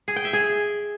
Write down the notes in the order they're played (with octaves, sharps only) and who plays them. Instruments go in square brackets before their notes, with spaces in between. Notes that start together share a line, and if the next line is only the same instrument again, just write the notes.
[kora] G#4
G5
E5
G#4